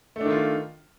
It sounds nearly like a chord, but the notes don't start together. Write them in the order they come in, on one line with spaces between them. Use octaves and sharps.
A3 D4 D#3 F4